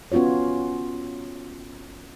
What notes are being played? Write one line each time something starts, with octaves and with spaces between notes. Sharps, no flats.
B3 C#4 F4 F#4 C#5